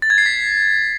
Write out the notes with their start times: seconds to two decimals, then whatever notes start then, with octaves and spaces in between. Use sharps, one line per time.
0.02 A6
0.10 G#6
0.18 C7
0.26 B6